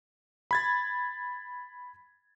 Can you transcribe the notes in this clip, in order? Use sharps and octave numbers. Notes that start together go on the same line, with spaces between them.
B5 G#6 A6